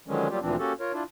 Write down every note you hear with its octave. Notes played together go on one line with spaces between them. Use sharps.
D3 D#3 F3 F#3 G#3 C#4
F#3 G3 A#3 F4 G4
D2 A#2 E3 F3 C4 D4
A#3 C#4 F#4 G4 A4
F4 A#4 C#5
D4 E4 F4